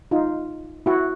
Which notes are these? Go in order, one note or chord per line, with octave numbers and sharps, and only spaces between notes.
D#4 F4
E4 F#4